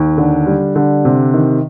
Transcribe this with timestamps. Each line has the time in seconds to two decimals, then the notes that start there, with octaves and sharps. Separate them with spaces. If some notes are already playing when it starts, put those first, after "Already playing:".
Already playing: D#2
0.18 D3
0.47 G3
0.76 D3
1.05 C3
1.33 D#3